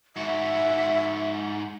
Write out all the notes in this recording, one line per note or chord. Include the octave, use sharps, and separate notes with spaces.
G#2 F#4 E5